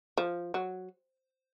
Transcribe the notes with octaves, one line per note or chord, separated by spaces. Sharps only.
F3
F#3